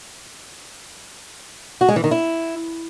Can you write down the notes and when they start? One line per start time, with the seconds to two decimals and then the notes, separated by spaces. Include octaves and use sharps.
1.81 F#4
1.88 G#3
1.96 E3
2.04 D#3
2.11 E4